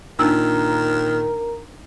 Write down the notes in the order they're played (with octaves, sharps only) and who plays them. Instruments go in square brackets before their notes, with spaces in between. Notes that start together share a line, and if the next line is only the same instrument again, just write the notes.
[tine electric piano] A#2 [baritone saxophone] D#3 [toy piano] D4 D#4 E6 [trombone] A#4